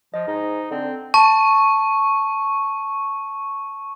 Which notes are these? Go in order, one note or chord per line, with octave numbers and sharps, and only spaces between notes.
F3 D#5
G#2 D#4
D3 C4
A5 C#6